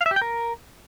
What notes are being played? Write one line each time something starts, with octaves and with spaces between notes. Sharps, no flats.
F5
E5
G4
G5
A#4